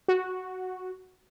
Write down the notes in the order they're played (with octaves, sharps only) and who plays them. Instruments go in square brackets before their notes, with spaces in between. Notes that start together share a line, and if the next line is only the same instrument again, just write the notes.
[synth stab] F#4